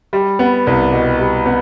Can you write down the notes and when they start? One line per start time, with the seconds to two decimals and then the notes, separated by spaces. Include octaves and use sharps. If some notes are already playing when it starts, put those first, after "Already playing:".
0.13 G3
0.39 B3
0.67 C2
0.92 B2
1.19 G3
1.46 B3